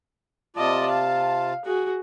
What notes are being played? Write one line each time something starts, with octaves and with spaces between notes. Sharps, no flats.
C3 F4 D5 D#5 A5
F5
F#4 G#4